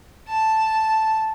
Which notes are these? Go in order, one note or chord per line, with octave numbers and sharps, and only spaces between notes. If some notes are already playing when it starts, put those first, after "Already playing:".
A5